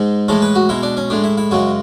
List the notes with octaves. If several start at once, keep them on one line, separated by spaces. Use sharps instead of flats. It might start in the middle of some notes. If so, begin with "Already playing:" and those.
Already playing: G#2 G#3
A2 E3 G#3 A4
B4
F#4
B2 G#3 E4
D4
C#4
A2 G#3 D4
E4
E4
F#2 C#3 G#3 F#4